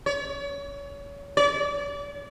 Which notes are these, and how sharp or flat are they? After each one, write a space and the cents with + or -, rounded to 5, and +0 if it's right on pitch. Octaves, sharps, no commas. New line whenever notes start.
C#5 +30
D5 -45